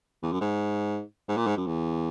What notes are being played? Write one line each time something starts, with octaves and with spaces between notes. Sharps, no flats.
E2
F#2
G#2
G#2
A#2
G#2
F#2
E2